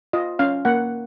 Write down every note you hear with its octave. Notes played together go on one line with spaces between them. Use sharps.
F4 D#5
C#4 F5
A#3 F#5